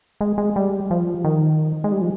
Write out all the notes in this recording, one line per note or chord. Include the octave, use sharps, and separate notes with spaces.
G#3
G#3
G3
F3
D#3
G#3
G3
F3